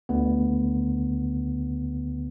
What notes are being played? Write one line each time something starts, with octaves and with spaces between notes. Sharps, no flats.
D2 D3 B3